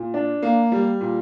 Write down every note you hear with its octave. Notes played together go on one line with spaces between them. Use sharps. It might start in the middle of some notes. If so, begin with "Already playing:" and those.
Already playing: A#2
D4
A#3
G3
A#2